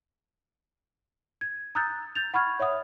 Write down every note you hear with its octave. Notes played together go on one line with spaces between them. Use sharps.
G#6
A#5 D#6 E6 F#6 G6 A6
G6 A6 F7
F#5 B5 C#6 F6 G#6
C#5 E5 F#5 D#6